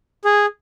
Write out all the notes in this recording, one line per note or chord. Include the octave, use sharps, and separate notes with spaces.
G#4